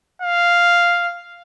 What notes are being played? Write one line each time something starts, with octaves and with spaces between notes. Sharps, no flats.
F5